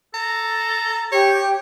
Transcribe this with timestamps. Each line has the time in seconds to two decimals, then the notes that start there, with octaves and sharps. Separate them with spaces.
0.14 A4 A#5
1.12 G4 C#5